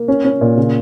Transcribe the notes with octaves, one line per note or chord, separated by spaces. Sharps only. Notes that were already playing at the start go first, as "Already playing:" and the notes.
Already playing: A#3
C#4
C#4
A#2
C#3